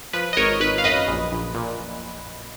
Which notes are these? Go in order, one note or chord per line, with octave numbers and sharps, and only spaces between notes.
F3 B4
D#5
G#1 A#4 C#5
G#1 B4
F5
F#2 B4 D#5
A#1
A#1
A#2